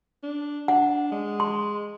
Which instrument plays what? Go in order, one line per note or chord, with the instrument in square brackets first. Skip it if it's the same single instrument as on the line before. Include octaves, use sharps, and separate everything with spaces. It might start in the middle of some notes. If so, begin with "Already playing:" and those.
[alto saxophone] D4
[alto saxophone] D4 [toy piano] F#5
[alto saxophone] G#3
[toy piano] C6